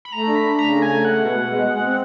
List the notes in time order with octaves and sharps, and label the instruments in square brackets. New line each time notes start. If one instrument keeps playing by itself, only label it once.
[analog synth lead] B5
[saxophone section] A3 [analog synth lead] A#5
[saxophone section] D4
[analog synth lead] B5
[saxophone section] D4
[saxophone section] C#3 [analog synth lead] A#5
[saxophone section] A3
[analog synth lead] G#5
[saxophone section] A3
[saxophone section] G#3 [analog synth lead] F#5
[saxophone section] B2
B2
G#3
G#3
C4